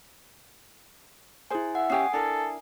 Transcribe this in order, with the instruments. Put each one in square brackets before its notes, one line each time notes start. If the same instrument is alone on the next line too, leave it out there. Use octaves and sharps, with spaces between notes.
[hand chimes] E4 G#5 [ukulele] G#4 C5
[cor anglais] E5 [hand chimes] F#5
[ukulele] C#4 G4 [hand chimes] G#5 D#6 C7
[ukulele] D4 E4 A#4 [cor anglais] A4